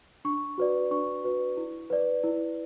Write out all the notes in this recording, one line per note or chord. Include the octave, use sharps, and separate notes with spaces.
D4 C#6
F#4 B4 D5
D4 C#6
F#4 B4 D5
E4
B4 D5
E4